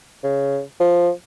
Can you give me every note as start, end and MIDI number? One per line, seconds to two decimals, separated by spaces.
0.24 0.60 49
0.80 1.10 53